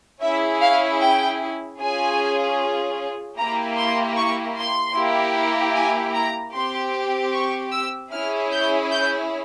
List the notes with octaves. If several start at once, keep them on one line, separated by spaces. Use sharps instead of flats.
C#4 E4 G#4 E5
F5
G5
C#4 F4 G#4 G#5
A#3 E4 G4 A#5
C6
C#6
C6
A#3 E4 G4
G#5
A#5
C4 G4 C6
C#6
E6
C#4 E4 G#4 F6
G6
G6